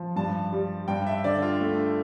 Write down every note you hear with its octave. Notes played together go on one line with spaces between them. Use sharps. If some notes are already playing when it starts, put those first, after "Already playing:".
Already playing: F3
G2 A5
G3
G2 G5
E5
D3 D5
F4
A3